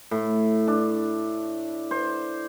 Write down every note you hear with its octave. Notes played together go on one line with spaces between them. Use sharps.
A2
D4
C5